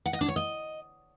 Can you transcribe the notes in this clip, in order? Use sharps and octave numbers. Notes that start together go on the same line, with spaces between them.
F#5
D#5
D4
C#5
D#5